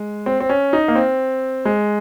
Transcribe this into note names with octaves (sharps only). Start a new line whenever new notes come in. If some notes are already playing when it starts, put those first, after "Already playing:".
Already playing: G#3
C4
C4
C#4
D#4
A#3
C4
G#3